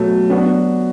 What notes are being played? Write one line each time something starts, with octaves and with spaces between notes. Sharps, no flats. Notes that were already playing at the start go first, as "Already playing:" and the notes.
Already playing: B2 F#3 A3
F#3 B3 D4 F#4